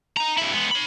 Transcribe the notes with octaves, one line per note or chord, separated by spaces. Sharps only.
D#4 A#5
G2 E4
G#3 B3
C#5 B5